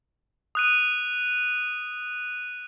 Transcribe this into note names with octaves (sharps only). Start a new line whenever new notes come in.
D#6 F#6 D#7